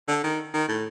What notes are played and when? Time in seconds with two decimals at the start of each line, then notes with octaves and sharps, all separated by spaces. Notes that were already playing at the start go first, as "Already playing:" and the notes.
0.08 D3
0.24 D#3
0.53 D#3
0.69 A2